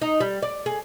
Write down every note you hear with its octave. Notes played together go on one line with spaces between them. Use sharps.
D#4
G3
D5
G#4